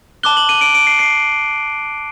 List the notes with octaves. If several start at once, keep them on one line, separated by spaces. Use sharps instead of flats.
A5 D6 F#6 G7
F#7
D#7
D7
D7
C7
C7